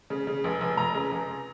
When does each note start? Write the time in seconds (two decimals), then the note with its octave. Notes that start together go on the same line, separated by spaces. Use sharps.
0.10 C#3
0.27 C#3
0.44 F1
0.61 F1
0.77 F1 A#5
0.94 C#3
1.11 F1